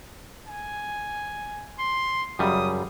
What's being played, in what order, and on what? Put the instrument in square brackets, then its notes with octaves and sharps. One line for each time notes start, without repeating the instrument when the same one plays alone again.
[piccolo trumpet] G#5
C6
[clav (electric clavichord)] F#2 C#3 G3 [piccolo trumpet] D#6